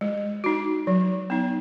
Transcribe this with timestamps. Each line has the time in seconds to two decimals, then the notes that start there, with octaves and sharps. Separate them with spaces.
0.01 G#3
0.44 D#4 F#4
0.87 F#3
1.30 B3 D#4